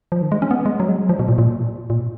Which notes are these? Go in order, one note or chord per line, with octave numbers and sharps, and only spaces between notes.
F3
D#3
G#3
C#4
B3
G#3
F#3
G#3
F#3
F3
B2
A#2
A#2
A#2